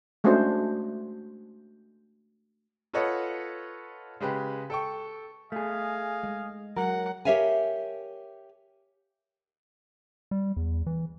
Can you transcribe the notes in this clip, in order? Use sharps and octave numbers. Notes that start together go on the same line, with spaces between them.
G#3 A3 C#4 D4 F#4 C5
F4 A4 B4 C#5 D#5 F#5
C#3 G#3 G4 B4
A4 G5 C#6
A3 G#4 D#5 F5 G#5
G#3
F#3 A#4 F#5
G4 A#4 C#5 E5 F5 G#5
G3
E2
E3